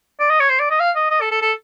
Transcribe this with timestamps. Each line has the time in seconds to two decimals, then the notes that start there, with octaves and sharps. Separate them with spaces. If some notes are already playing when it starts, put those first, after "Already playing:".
0.20 D5
0.30 D#5
0.40 C#5
0.50 C5
0.60 D5
0.70 D#5
0.80 F5
0.96 D#5
1.10 D#5
1.21 A4
1.31 A4
1.42 A4